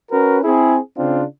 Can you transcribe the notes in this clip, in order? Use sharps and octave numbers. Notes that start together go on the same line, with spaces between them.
C#4 F#4 A#4 B4
C4 E4 G#4
C#3 C4 D4 F4